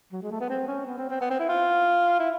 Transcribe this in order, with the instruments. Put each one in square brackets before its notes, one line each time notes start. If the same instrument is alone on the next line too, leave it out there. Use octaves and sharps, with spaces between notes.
[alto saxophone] F#3
G#3
A3
B3
C4
C#4
B3
C4
C4
B3
C4
E4
F4
E4